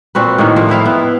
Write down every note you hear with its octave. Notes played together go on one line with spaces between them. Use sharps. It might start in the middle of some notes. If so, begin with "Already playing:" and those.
A#2 C4 F#4 B4
A2 D#3 A#3
F3
B3 C4 E4 F5
B3